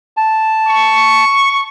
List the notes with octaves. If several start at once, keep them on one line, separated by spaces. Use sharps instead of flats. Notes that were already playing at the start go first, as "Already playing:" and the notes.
A5
C#6